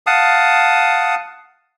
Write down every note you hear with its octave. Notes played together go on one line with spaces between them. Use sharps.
F5 F#5 A5 D#6